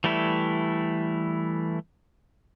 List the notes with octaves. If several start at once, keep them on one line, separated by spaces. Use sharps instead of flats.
E3 G3 A3 E4